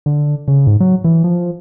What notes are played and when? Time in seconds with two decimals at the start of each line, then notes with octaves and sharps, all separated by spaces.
0.06 D3
0.48 C#3
0.67 G#2
0.80 F#3
1.04 E3
1.24 F3